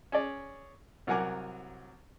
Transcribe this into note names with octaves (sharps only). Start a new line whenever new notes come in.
C#4 G#4 D5
C2 F#3 A#4 F#5 G#5 D6